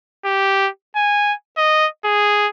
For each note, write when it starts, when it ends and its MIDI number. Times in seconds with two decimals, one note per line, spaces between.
0.25 0.69 67
0.96 1.34 80
1.57 1.87 75
2.05 2.48 68